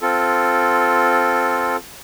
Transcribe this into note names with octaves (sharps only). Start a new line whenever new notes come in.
C4 F4 A4